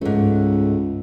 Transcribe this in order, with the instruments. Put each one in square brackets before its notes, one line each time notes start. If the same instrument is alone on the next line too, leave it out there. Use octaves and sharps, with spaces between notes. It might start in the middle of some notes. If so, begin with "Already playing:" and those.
[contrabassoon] C#2 [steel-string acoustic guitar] G#2 A3